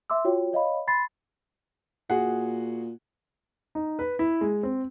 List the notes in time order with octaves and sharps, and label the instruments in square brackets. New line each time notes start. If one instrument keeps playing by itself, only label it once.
[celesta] E5 C6 D6 E6
F4 F#4 C#5 G5
C#5 D#5 F5 B5
B5 C6 A6 C7
[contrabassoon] A#2 [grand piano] F#4 G#4 F#5
[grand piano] D#4
B4
E4
G#3
C4